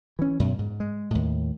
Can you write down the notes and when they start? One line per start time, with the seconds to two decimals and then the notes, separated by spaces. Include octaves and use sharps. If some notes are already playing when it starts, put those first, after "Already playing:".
0.19 E3 C#4
0.40 F#2 B2
0.59 G#2
0.80 G#3
1.11 D#2 A2